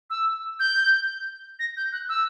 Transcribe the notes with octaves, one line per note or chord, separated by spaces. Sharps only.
E6
G6
A#6
G6
F#6
E6